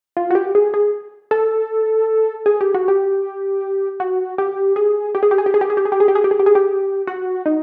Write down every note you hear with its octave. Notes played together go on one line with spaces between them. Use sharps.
F4
F#4
G4
G#4
G#4
A4
G#4
G4
F#4
G4
F#4
G4
G#4
G4
G#4
G4
G#4
G4
G#4
G4
G#4
G4
G#4
G4
G#4
G4
G#4
G4
G#4
G4
G#4
G4
F#4
D#4